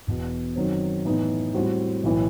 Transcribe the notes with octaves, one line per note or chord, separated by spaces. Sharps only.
E1 E2 B2
F#2 D#3 F#3 C4
A2 E3 B3 D#4
A2 G3 C4 F#4
B1 A2 E3